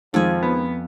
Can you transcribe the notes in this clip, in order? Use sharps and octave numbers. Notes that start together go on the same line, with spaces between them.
F2 D#3 F3 G#3 G#5
B3